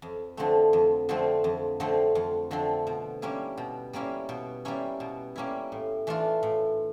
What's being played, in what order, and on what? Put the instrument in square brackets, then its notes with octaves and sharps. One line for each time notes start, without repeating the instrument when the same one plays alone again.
[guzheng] F2
D3 F3 A3 C4
F2
D3 F3 A3 C4
F2
D3 F3 A3 C4
F2
D3 F3 A3 C4
B2
G3 A#3 C#4 E4
B2
G3 A#3 C#4 E4
B2
G3 A#3 C#4 E4
B2
G3 A#3 C#4 E4
A2
E3 A3 D4 F4
A2